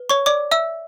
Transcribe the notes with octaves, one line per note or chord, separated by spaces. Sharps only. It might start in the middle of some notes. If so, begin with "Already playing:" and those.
Already playing: B4
C#5 C#6
D5 D6
E5 E6